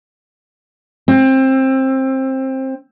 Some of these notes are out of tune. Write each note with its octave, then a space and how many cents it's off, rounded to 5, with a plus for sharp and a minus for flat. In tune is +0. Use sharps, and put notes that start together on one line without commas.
C4 +20